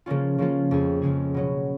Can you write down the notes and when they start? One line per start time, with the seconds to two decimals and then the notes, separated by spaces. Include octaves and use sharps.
0.06 C#3 F3 A#3 C#4 F4
0.38 C#3 F3 A#3 C#4 F4
0.71 F2 C#3 G#3 C#4 G#4
1.02 F2 C#3 G#3 C#4 G#4
1.34 B2 F#3 C#4